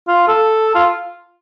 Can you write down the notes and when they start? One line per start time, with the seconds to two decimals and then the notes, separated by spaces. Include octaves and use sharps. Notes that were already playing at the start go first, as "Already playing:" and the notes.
0.08 F4
0.28 A4
0.75 F4